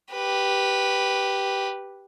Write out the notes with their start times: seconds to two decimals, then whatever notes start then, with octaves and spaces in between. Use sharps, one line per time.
0.12 G4 B4